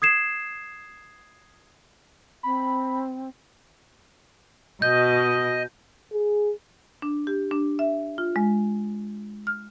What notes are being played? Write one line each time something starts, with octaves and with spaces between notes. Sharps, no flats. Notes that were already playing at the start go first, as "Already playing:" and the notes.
D#6 G#6 C7 E7
C4 B5
B2 D#5 G6
G#4
D4
G4
D4
E5
F4
G#3
F6